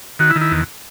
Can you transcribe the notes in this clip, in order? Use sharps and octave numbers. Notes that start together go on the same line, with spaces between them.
D#3 F#4
E4
D#3
E4
E2